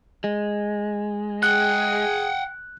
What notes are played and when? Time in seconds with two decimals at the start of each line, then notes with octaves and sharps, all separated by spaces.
0.24 G#3
1.43 G#4 F#5 G5 F#6